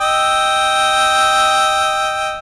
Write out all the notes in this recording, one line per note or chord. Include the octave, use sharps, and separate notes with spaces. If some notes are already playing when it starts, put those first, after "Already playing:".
D#5 G5 E6